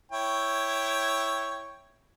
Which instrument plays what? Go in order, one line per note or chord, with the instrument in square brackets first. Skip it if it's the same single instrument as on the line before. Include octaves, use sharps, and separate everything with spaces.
[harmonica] E4 C#5 G5